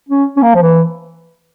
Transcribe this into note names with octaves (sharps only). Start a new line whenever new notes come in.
C#4
C#4
A#3
F3
E3